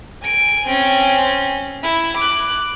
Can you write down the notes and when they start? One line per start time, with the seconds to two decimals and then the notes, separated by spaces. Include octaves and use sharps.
0.22 G#5 D7
0.67 C4 C#4
1.83 E4
2.17 D6 F#6